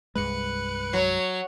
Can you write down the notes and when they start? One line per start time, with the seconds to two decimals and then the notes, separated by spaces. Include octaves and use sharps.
0.15 C2 G2 G#3 B4 F#6 C#7
0.93 F#3 C#5